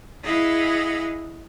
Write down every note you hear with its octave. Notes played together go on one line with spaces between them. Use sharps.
E4 G#4 D#5 F5 F#5